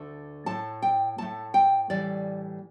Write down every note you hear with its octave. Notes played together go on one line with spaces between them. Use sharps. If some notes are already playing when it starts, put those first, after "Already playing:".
Already playing: D2 D3 A3
A2 A3 A5
G5
A2 A3 A5
G5
A2 E3 G3 D5